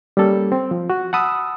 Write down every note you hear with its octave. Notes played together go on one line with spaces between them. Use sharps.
G3 A#3 C#4 A4
C4
F3
F#4
F#5 A5 B5 D#6 E6